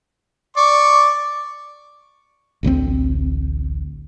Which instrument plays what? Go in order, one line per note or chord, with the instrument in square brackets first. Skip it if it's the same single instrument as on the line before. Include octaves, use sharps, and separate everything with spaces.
[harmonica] D5 C#6
[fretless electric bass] A1 D2 G3 C4